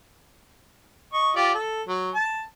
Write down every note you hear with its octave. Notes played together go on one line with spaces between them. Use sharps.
D#5 C#6
F4 G4 D5
A4
F#3
A5